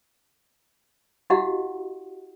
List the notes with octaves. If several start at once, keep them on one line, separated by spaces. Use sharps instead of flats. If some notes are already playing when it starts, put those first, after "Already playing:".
E4 F#4 G4 D#5 F5 F#5